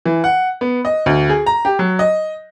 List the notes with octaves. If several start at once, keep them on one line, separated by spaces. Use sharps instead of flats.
E3
F#5
B3
D#5
D2
G#4
A#5
G4
F#3
D#5